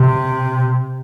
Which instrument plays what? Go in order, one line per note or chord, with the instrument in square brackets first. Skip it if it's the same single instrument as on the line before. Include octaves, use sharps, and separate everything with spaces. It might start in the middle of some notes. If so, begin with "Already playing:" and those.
Already playing: [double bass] C3